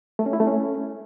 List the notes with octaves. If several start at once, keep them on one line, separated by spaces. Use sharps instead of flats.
A3
C#4
E4
A3
C#4